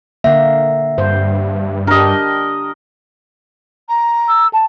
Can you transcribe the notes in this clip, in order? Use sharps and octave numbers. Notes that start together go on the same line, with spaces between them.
D3 A#3 E5 F#5
G2 C5
D4 G4 A#4 D#5
A#5
E6
A5